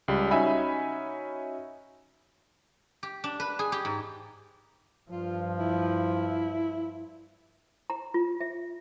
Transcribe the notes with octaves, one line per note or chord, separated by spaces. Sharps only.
C#2 G3
C#4 D#4 F#4 E5 G#5 B5
G4
D4
B4
G#4
G4
G#2
G2 F3 F4
E4
A#5
F4
E5